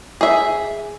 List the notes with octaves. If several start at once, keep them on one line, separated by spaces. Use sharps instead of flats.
G#4 E5